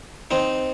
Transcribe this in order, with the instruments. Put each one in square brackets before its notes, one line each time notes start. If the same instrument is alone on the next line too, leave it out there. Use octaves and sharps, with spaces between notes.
[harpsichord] C4 D#4